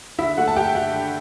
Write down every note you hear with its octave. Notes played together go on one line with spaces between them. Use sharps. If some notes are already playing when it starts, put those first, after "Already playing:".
D3 E4 E5
A3 F#4 F#5
A5
G2 G4 G5
G2 F#4 F#5
D3